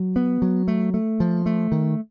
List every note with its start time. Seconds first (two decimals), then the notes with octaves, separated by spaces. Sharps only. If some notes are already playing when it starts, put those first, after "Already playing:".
Already playing: F#3
0.16 B3
0.42 F#3
0.68 A3
0.94 A3
1.20 F3
1.46 A3
1.72 D#3